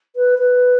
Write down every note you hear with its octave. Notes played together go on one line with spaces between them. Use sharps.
B4
B4